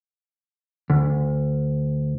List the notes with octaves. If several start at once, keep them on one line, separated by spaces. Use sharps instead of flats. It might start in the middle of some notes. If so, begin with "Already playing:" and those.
D2